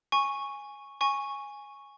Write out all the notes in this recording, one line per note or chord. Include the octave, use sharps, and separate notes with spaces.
G#5 C#6
G#5 C#6